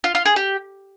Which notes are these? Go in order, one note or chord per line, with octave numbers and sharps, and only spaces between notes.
F4
F4
G#4
G4